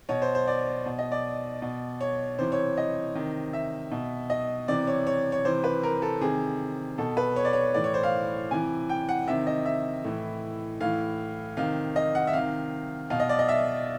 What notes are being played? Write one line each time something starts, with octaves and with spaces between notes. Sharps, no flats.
B2 C#5
C5
C5
D5
B2
D#5
D5
B2
C#5
C3 E3 C5
C#5
D#5
C3 D#3
E5
B2
D#5
C3 E3 D5
C#5
C#5
C#5
C3 E3 C5
B4
A#4
A4
C3 D#3 G#4
B2 A4
B4
C#5
D5
C#5
A2 E3 D5
C#5
C5
F5
C3 E3 G#5
G5
F#5
C3 D#3 E5
D#5
E5
A2 E3
A2 E3 F5
C3 D#3 F5
D#5
F#5
E5
C3 D#3 F5
B2 F5
D#5
D5
D#5
E5